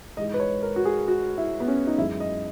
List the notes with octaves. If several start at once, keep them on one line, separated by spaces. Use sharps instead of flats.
G#2 E3 G#3 D#5
B4
C#5
A#4
F#4
G#4
F#4
E4
B3
C#4
D#4
F#2 E3 G#3 E4
D#5